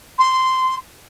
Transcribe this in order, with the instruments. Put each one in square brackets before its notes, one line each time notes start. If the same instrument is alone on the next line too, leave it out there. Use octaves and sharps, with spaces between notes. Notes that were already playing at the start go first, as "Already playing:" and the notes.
[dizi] C6